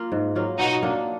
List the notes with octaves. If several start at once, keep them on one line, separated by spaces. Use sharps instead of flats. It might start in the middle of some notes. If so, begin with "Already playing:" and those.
Already playing: A#3 F4
G#2
F#3 A#3 F4
B2 D#4 F#4
A#3 D4